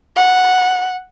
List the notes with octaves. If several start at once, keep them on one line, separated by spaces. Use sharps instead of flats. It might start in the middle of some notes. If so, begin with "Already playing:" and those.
F#5